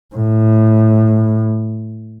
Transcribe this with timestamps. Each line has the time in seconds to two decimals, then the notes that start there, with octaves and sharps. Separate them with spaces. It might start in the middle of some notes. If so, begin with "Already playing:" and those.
0.16 A2